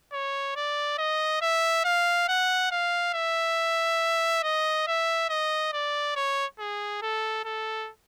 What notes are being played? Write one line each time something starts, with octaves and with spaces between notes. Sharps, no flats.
C#5
D5
D#5
E5
F5
F#5
F5
E5
D#5
E5
D#5
D5
C#5
G#4
A4
A4